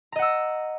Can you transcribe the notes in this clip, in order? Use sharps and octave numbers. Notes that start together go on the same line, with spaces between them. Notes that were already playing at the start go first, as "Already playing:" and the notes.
D#5 F#5 A#5 E6